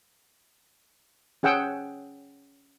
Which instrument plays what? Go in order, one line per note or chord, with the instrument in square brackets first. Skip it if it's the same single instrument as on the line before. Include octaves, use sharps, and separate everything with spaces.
[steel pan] C#4 G#4 F#5 G5 E6